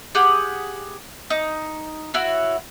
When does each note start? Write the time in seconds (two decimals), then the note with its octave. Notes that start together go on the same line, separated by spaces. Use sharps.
0.15 G4 G#4 F#5 D#6
1.30 D#4
2.14 E4 F#4 C#5